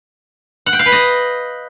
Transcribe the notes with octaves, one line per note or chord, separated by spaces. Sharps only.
F#5
G5
F5
B4
D#5